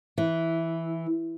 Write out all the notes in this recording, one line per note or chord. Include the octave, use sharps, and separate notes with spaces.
E3